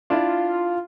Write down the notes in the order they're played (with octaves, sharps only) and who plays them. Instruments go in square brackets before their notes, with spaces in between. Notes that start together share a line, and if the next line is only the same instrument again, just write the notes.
[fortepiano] D4 E4 [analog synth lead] F4